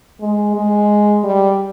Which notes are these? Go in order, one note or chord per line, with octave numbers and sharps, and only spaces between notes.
G#3
G#3
G3